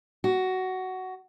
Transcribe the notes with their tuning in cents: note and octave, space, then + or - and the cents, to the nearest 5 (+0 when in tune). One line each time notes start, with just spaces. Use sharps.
F#4 +10